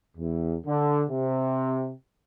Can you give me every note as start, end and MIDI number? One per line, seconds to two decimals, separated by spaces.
0.17 0.56 40
0.67 1.03 50
1.09 1.92 48